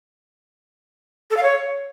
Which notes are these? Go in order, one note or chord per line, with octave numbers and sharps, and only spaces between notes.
A4
F5
C#5